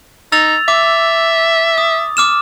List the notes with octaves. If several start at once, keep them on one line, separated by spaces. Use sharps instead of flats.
D#4 E6 A6 F7
E5 D6
D#6
D6 F6 E7